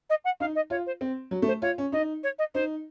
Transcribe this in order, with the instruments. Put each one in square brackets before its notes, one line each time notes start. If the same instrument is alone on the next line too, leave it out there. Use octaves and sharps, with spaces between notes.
[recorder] D#5
F#5
[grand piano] D#4 [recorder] F5
[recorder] D#5
[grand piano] F4 [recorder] C#5
[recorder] C5
[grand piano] C4
F#3
A3
[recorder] C5
[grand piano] F4 [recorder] C#5
[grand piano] C#4
[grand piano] D#4 [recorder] D#5
[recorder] C#5
D#5
[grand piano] D#4 [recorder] C5